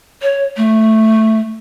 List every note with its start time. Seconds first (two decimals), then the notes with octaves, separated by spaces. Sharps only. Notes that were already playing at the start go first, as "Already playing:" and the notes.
0.22 C#5
0.57 A3